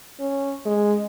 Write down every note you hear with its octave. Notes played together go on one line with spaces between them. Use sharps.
C#4
G#3